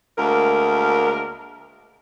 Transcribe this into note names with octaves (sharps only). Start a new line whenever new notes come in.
D2 G#3 A#3 A#4